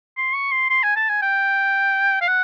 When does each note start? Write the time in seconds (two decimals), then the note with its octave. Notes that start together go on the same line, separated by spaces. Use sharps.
0.17 C6
0.34 C#6
0.52 C6
0.70 C6
0.83 G#5
0.96 A5
1.09 G#5
1.22 G5
2.21 F5
2.28 F#5